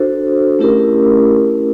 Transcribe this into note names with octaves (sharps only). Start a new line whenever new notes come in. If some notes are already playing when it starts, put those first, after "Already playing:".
Already playing: D4 F#4 A4 C5
A3 C#4 E4 G4 A#4